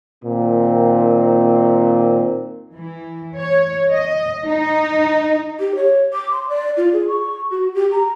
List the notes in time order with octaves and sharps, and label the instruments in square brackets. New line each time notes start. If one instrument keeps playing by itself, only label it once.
[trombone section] A#2 D#3 C4
[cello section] E3
C#5
D#5
D#4
[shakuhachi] G4
C#5
D6
C6
D5
F4
G#4
C#6
F#4
G4
A#5